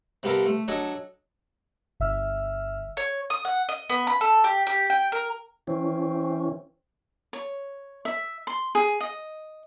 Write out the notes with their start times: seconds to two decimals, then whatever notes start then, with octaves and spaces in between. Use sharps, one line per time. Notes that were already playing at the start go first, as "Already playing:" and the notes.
0.23 C3 G3 B3 F4 A4 A#4
0.46 A3
0.68 F#3 D4 A4 D#5 G#5
2.00 G1 E5 E6 F6
2.97 C#5
3.30 D#6
3.45 F#5
3.69 D#5
3.90 B3
4.07 B5
4.21 A4
4.44 G4
4.67 G4
4.90 G5
5.12 A#4
5.67 E3 C4 C#4
7.33 C#5
8.05 E5
8.47 C6
8.75 G#4
9.01 D#5